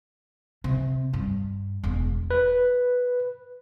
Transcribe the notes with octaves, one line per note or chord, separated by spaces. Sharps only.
C3
G2
E1
B4